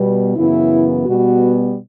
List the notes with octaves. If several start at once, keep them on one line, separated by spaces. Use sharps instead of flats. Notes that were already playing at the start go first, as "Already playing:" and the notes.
Already playing: B2 G3 B3
F#2 C#3 E3 B3 E4
B2 G3 B3 F#4